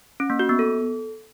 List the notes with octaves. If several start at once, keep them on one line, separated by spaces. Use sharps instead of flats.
C#4
A#3
F#4
B3
A4